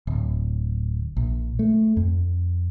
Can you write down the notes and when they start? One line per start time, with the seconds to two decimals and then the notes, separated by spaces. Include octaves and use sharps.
0.07 D1
1.17 A#1
1.59 A3
1.97 F2